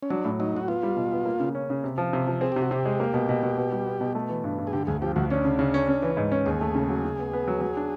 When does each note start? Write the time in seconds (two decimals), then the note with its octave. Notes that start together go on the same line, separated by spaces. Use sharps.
0.03 C#4
0.10 F#3 D4
0.25 A2
0.40 F#3 D#4
0.54 A2 F#4
0.68 B3 F4
0.83 G3
0.97 B2
1.12 B3
1.25 A#3
1.40 C#3
1.55 C#4
1.70 C#3
1.84 C3
1.98 F3
2.13 C3
2.27 F3
2.41 C4 G#4
2.52 C3 G4
2.62 F#4
2.71 C3 G4
2.86 G#3
3.00 A#3
3.14 B2
3.29 B2
3.43 B2
3.57 B2
3.72 G3
3.86 B3
4.01 B2
4.15 A3
4.29 E3
4.44 G2
4.58 G2
4.67 G#4
4.73 D3 G4
4.87 D2 G#4
5.02 F3 G4
5.16 D2 F#4
5.30 C#4 D4
5.45 C#3
5.59 C#3
5.74 C#4
5.88 C#4
6.02 E3
6.17 G#2
6.32 C#4
6.46 D#2 G#4
6.61 A3
6.75 C#3
6.89 F#3
7.04 C#3
7.19 B3
7.33 B3
7.47 F#3
7.61 F#3
7.77 D4